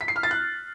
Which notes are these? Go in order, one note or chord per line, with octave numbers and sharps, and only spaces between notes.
B6
C7
F6
A6
F#6